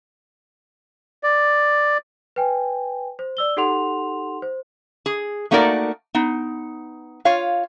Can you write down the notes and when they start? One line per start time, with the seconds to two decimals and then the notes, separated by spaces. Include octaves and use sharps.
1.23 D5
2.36 B4 G5 G#5
3.19 C5
3.37 D5 E6 G7
3.57 D#4 G4 A4 F#5 C6 F7
4.42 C5
5.06 G#4
5.51 A3 A#3 D#4 F#4 A#4 D5
6.15 B3 D#4
7.25 F4 C#5 F5